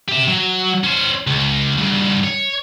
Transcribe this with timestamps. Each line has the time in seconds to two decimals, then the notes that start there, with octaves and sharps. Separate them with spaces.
0.09 G4 E5
0.28 F#3
0.84 C#4 C5
1.27 C#2
1.78 G2 C#3
2.24 C#5